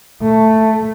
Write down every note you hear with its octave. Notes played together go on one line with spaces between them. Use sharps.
A3